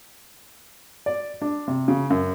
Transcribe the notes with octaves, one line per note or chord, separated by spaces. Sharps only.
D5
D4
C3
C#3
F#2